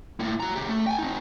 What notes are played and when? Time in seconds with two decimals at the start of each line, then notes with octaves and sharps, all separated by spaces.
0.20 A2 A#3
0.40 F#4 A#5
0.55 C#3 G4
0.69 A3
0.87 G5 G#5
0.99 C4 D#4